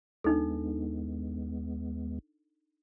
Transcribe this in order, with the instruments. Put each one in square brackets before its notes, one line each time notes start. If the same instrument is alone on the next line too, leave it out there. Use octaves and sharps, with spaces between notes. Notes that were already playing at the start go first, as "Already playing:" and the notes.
[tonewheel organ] D#2 G#3 B3 [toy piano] D4 D#4 A4